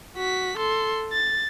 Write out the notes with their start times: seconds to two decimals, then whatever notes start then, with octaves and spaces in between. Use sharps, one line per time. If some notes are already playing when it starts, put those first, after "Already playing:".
0.17 F#4 B6
0.57 A4 C6
1.12 A6